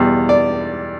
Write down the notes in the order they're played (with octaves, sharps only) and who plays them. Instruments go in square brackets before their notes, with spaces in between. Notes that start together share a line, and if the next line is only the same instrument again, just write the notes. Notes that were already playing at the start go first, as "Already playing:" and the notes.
Already playing: [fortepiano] E2 B2 G3
D5